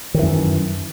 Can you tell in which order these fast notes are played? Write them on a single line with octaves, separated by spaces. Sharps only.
D#3 E3 F#2